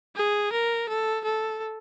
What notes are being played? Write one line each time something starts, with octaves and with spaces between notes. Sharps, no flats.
G#4
A#4
A4
A4